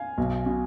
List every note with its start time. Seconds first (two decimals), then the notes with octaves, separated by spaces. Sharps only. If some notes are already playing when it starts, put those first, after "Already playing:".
Already playing: F5 G#5
0.18 B1
0.46 B2